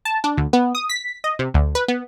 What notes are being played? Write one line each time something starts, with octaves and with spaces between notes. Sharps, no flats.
A5
D4
D2
B3
D#6
B6
D#5
C3
D2
B4
B3